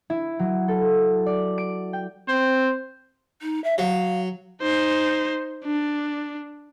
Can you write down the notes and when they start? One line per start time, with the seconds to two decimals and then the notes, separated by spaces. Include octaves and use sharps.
0.10 E4
0.39 F#3
0.68 A4
1.26 D5
1.58 D7
1.93 G5
2.28 C4 C5
3.42 D#4
3.64 E5
3.78 F#3 F5
4.62 D#4 C5
5.65 D4